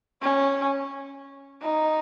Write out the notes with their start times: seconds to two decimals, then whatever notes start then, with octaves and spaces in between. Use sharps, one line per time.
0.22 C#4
1.62 D#4